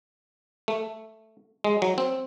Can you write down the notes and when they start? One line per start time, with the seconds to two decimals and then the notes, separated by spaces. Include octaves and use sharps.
0.68 A3
1.64 G#3
1.82 F#3
1.98 C4